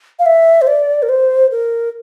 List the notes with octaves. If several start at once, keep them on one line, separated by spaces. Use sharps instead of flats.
F5
E5
C5
D5
A#4
C5
A#4